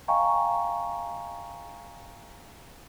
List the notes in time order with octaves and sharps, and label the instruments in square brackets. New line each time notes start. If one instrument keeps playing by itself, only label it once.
[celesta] D#5 F5 G5 G#5 A#5 C#6